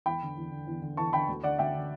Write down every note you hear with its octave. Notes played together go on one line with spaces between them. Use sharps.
E2 G5 B5
D3
E2
D3
E2
D3
E2 A5 C#6
D3 G5 B5
D2
D3 D5 F#5
D2 E5 G5
D3